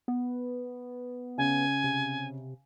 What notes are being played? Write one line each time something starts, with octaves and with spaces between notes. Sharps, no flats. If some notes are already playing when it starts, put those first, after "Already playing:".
B3
C#3 G#5
C3